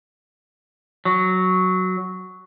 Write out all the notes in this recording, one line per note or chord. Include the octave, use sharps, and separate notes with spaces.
F#3